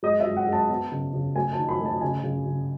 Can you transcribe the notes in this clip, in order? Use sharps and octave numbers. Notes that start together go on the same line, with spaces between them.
G#3 D#5
E5
G#3
F#5
G#3
A5
B3 A5
C#3
C#3
A3 G#5
A5
D#3
B5
A3
A5
C#3 G#5
C#3
C#3